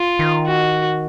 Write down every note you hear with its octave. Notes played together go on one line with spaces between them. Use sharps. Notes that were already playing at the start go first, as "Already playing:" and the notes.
Already playing: F4
D#3
F#4